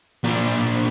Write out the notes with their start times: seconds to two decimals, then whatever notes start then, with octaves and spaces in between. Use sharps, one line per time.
0.24 A#2 D4